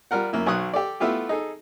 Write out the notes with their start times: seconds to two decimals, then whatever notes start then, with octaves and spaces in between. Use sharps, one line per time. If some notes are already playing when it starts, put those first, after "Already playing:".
0.11 G3 F4 A#4 F#5
0.33 F#2 A#3 E4
0.46 B1 F#3 C#6 D#6 F#6
0.73 G4 A4 D5
1.00 A3 B3 E4 F4 G4
1.29 D#4 G#4 A4